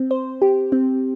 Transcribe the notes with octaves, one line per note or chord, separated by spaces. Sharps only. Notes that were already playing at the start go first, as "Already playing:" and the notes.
Already playing: C4
C5
G4
C4